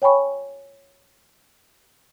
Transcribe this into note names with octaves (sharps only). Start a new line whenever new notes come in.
C#5 G5 G#5 B5 C#6